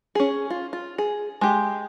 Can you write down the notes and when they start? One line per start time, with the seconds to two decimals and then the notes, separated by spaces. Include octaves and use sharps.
0.15 C#4 G#4
0.50 F4
0.73 F4
0.98 G#4
1.41 G#3 G4